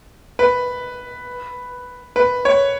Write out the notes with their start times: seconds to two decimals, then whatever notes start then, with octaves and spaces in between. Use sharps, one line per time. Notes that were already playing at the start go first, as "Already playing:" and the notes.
0.39 B4
2.16 B4
2.45 C#5